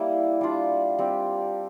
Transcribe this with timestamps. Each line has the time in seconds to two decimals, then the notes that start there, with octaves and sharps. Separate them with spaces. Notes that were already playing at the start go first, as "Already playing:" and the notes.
Already playing: G3 A#3 E4
0.41 G3 D4 F4
0.99 G3 C4 G4